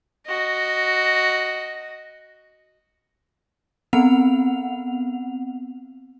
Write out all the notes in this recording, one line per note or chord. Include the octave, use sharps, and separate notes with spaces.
F#4 D#5
B3 C4 F#5 F7